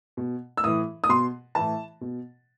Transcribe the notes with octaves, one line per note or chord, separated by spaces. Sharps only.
B2
E6
A2 E3 D#6
D#6
B2 C6
A2 E3 A5
B2